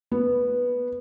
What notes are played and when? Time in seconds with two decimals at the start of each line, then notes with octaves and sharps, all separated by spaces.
0.12 B3